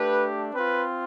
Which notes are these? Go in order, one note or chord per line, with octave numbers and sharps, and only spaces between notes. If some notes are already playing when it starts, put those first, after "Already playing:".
Already playing: A3 D4 G4 B4
C4 F4 B4